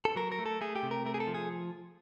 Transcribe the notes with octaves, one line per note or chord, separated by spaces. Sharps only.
A4
F#3 A#4
A#4
A3
A4
A3 G#4
G4
C3
A#4
A3 A#4
G#4
A4
F3
G#4